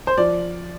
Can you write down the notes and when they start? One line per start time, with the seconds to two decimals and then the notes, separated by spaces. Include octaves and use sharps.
0.07 C5
0.18 F3 D5